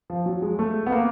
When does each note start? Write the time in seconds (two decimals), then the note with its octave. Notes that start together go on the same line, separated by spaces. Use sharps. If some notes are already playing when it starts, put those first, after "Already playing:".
0.10 F3
0.26 F#3
0.42 G#3
0.59 A3
0.86 B3
0.92 A#3